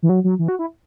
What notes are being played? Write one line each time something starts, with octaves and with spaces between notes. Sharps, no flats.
E3
F#3
F#3
E3
F#4
E4